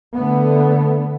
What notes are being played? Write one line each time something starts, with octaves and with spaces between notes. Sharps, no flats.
D3 A3 B3